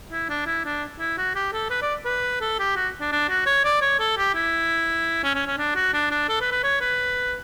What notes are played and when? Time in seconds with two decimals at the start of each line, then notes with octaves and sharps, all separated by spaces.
0.11 E4
0.29 D4
0.46 E4
0.65 D4
1.00 E4
1.18 F#4
1.36 G4
1.53 A4
1.70 B4
1.82 D5
2.05 B4
2.41 A4
2.59 G4
2.76 F#4
3.00 D4
3.12 D4
3.29 F#4
3.46 C#5
3.64 D5
3.81 C#5
4.00 A4
4.17 G4
4.35 E4
5.24 C#4
5.35 C#4
5.47 C#4
5.58 D4
5.75 F#4
5.93 D4
6.11 D4
6.29 A4
6.41 B4
6.52 B4
6.63 C#5
6.81 B4